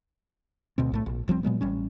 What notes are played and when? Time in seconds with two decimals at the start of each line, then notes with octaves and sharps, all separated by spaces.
0.78 D2 B2 C4
0.92 B1 A2 A3
1.06 A#1
1.28 E1 F3 G3 C4
1.43 A#2 F#3 G#3 B3
1.61 A1 G3 C#4